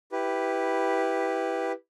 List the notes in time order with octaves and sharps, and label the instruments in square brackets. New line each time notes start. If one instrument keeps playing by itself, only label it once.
[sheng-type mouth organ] E4 G4 B4